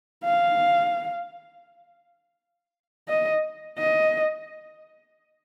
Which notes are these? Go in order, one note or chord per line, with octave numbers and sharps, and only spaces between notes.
F5
D#5
D#5